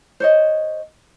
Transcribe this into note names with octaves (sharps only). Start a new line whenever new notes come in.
C5 C#5 D#5